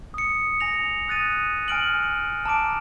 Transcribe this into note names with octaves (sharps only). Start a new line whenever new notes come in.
D#6 C#7
G#5 A#6 F7
D#6 F#6 A6 D#7
G#5 F6 D7 F#7
A5 A#5 D6 D7